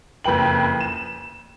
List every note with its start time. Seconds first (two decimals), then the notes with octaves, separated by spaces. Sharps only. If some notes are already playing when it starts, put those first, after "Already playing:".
0.24 F#1 F2 B4 G5 F#7
0.80 E7